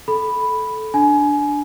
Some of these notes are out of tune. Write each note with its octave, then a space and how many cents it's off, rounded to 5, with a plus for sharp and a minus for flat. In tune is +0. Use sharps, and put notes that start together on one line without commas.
A4 -15 B5 +0
D4 +0 G#5 +25